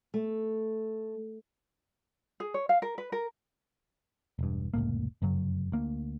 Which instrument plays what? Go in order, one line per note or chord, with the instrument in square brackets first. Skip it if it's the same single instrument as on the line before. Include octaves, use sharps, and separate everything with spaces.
[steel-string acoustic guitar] A3
[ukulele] G#4
C#5
F5
A#4
B4
A#4
[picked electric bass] E1 G2
F1 C#2 A2 A#3
F1 F#2 C#3 F#3
D2 A#3